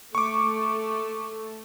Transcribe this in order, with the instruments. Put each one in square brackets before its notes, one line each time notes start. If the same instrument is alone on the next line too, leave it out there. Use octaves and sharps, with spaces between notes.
[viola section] A3 [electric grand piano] C#6 D6